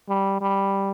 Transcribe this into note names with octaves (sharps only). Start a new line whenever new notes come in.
G3
G3